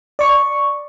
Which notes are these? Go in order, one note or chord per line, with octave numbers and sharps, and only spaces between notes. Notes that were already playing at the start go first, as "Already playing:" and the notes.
D5 C#6